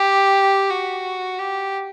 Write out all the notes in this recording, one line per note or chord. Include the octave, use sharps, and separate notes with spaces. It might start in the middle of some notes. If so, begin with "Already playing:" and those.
Already playing: G4
F#4
G4